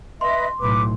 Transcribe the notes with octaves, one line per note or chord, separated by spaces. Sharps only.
B4 D#5 E5 C6
B1 A2 B4 D6